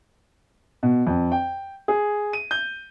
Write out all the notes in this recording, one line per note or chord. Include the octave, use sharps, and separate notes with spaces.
B2
F2
G5
G#4
D#7
G6